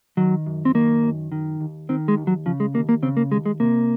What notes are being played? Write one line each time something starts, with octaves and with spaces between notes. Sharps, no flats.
D#3 F#3
F#2
C4
D#3 A#3
F#2
D#3
D#2
D#3 C4
G#3
D#2
F#3
C#3 F3
G#3
D#2 A#3
A#3
C#3 C4
A#3
D#2 G#3
G#3
C3 A#3